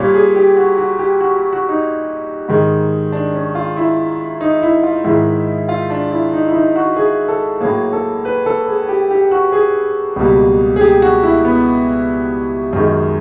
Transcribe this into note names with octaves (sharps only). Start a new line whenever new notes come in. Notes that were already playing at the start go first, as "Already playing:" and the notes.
Already playing: A#2 G3 A#3 C#5
G#4
G4
F#4
F#4
G4
F#4
F#4
F#4
D#4
G#2 D#3 G#3
D4
C#4
F4
E4
D#4
E4
F4
G#2 D#3 G#3 E4
F4
D4
E4
D#4
E4
D#4
F#4
G#4
A4
A2 F#3 A#3 G#4
A4
B4
A4
G#4
G4
G4
F#4
G#4
C#2 B2 G3 A#3
G#4
G4
F#4
E4
B3
F#2 D#3 G#3